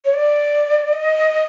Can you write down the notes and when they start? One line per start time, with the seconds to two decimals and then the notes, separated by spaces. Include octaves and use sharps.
0.05 C#5
0.14 D5
0.93 D#5